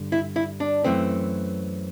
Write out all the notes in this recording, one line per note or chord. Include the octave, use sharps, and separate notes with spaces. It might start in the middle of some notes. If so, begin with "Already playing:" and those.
Already playing: G2 D3
E4
E4
D4
F#2 E3 A3 C4